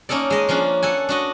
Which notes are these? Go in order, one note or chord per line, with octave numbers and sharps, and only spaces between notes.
A#3 C#4 D#4 A4 D5
G#3 D#5
F3 A#3 C#4 D4
A4 F#5 G#5
D4 F#4 D#5